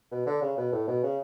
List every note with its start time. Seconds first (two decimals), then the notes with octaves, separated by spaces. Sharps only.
0.12 B2
0.26 D3
0.42 C#3
0.57 B2
0.72 A2
0.88 B2
1.03 C#3